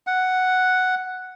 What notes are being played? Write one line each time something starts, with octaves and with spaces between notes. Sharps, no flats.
F#5